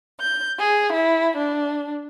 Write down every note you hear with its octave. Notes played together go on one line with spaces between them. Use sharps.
G6
G#4
E4
D4